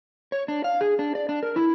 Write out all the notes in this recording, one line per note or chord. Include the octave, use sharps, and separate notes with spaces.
C#5
D4
F5
G#4
D4
D5
D4
A#4
E4